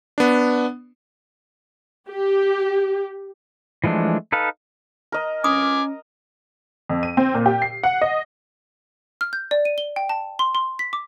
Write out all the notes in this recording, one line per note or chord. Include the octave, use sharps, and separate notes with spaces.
B3 D4
G4
E3 F3 G#3 A3 D4
D#4 A4 B4 F5
A#4 D#5
C#4 G#5 D6 D#6
F2
D#7
C4
A#2
G4
C7
F#5
D#5
F6
G6
D5
D#7
G7
G5
A5
C6
C6
B6
D6